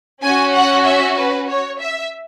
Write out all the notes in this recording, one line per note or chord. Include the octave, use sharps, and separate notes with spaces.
C#4 F#4 G#5
F#5
E5
B4
C#5
E5